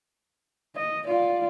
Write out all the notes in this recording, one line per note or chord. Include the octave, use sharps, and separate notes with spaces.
D#5
F4 D5